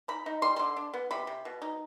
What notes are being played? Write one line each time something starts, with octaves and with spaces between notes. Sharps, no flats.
D#4 B5
D#4
G3 C6
D3 C6
D4
B3
C3 B5
C3
B2
D#4